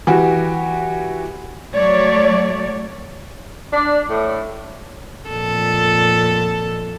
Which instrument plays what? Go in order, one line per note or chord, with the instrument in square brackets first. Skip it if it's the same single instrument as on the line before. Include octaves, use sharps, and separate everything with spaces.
[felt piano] E3 F#4 G4
[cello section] F#3 A3 C#5 D5
[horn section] D4
A2
[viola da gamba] F2 A#2 A4